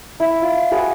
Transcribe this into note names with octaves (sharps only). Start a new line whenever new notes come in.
E4
F4
F#4 G#4 B4 F5